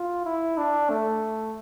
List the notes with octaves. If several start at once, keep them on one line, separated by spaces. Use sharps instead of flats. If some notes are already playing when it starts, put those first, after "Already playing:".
Already playing: F4
E4
D4
A3